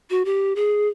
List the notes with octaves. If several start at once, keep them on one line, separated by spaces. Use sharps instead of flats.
F#4
G4
G#4